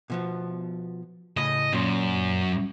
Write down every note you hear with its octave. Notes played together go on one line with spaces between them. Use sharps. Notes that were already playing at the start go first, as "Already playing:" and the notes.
B2 F3 B3
A2 C#3 D#5 B5
F#2 A#2 C6